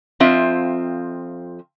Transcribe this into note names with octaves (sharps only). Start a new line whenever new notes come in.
F2 C4 F4 E5